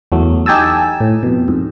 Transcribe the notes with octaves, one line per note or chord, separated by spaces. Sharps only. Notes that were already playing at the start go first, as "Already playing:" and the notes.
E2 F#3 A3
D#4 G4 G#5 A5 E6
A2
F2 B2
F2 G#2